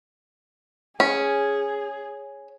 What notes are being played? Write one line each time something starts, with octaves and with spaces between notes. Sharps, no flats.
C#4 G#4